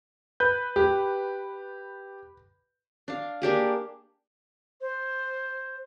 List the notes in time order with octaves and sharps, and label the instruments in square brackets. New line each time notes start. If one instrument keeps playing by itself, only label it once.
[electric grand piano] B4 G6
[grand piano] G4
[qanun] D4 F5
A#3 D4 G4 G#4
[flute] C5